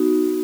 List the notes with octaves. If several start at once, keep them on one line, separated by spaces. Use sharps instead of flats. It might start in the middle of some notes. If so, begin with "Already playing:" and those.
Already playing: B3 D#4 F#4